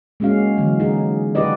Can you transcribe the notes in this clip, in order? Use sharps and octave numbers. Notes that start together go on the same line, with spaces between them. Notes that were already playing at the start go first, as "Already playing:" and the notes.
G#3 A#3 C#4 F#4 F5
D3 E3 F#3
D#4 G#4
D#4 F4 G4 B4 D5 D#5